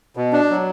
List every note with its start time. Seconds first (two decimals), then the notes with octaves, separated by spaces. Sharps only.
0.17 B2
0.33 D4
0.50 F#3